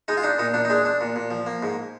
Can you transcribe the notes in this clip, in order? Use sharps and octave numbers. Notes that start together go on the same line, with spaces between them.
G#3 D#4
F4
D4 D#4
A#2 D#4
A#2 D4
D#4
G#3 D4
D4
A#2
A#2
F3
A#3
G#2